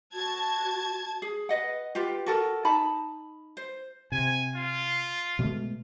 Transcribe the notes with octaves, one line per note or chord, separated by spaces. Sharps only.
F#4 A5 G#6
G#4
B4 D#5 F#5
F4 G4 B4
F#4 A4 A#4
D#4 A5 B5
C5
C3 G#5
F4
B2 G#3 A3